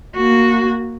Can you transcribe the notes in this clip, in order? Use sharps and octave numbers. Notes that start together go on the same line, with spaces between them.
A#3 F#4